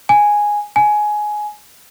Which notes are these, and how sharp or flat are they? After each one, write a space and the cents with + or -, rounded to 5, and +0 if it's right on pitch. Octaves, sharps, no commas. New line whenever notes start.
G#5 -5
G#5 +15